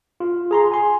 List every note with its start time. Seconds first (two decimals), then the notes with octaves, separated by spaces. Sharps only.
0.20 F4
0.51 G#4 A#5 C6
0.72 G#5 C6